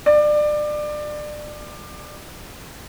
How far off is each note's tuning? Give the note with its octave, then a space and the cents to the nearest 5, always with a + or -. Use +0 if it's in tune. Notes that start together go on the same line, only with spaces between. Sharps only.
D5 +25